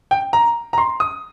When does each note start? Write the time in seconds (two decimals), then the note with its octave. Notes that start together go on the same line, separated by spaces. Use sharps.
0.11 G5
0.33 A#5
0.73 A#5
0.78 C6
1.00 D#6